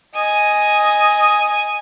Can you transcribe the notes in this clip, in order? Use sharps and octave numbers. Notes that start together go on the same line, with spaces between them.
D#5 G#5